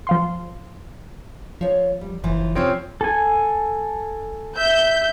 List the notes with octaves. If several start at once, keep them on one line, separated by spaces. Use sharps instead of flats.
F3 F5 C6
F3 F4 C#5
G3
F#1 D#2 E3 F3
C3 F3 C4 C#4 C5 C#5
A4 G#5
E5 G6